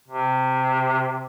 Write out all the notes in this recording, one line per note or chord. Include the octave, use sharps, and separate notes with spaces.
C3